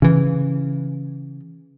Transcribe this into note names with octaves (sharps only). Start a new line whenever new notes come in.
C#3 E3